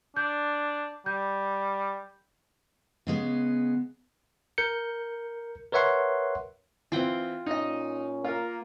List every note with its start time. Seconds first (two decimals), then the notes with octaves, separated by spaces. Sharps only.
0.17 D4 G6
1.06 G3 G6
3.07 C#3 G#3 B3
4.58 A#4 G6 C#7
5.72 A#4 B4 C#5 E5 F#5 C6
6.92 E3 C4 F4 F#5 G5
7.46 A#2 C#4 D#4 D#5
8.24 A#3 F4 A#4